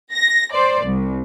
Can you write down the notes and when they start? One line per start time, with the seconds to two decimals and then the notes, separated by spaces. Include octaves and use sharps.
0.13 A#6
0.53 C5 D5
0.85 C2